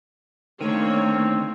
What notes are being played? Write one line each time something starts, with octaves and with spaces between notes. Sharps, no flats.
D3 D#3 A3 A#3 C4 D#4 C#5